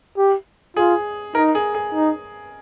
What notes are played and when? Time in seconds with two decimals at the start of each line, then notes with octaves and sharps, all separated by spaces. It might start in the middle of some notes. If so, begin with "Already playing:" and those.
0.17 G4
0.77 F4 G#4
1.35 D#4 A#4
1.55 G#4
1.74 G#4
1.94 D#4